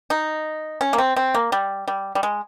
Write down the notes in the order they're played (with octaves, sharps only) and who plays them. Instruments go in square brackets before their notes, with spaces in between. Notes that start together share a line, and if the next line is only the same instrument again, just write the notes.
[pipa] D#4
C#4
A#3
C4
C4
A#3
G3
G3
G3
G#3